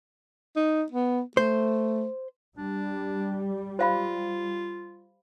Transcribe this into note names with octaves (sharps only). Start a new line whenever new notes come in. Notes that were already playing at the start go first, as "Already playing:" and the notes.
D#4
B3
A3 C5
G3 D4
F4 C5 F5 B5